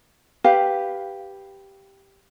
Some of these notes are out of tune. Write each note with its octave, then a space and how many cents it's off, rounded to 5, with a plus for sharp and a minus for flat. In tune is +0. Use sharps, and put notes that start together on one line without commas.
G4 +0 B4 +0 F5 +0